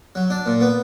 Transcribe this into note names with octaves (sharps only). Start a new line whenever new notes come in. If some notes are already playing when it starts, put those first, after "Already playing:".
F#3
D4
A#2
B3